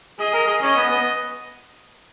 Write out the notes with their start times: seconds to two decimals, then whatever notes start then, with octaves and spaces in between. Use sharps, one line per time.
0.19 G#4 D#5
0.33 A#4
0.47 G#4
0.62 C#4 D#5
0.77 B3
0.90 B3